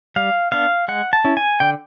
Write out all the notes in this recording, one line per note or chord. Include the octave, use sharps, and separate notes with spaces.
G3 F5
B3 D4 F5
G#3 F#5
A5
C#4 E4
G#5
D3 G5